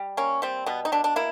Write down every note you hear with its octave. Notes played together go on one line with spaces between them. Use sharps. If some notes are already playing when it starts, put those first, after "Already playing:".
Already playing: G3
A#3 C#4
G3 C4
B2 B3
D#4
B2 D4
D4
A#3 E4